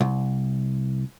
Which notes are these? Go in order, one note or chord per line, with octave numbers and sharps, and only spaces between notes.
C2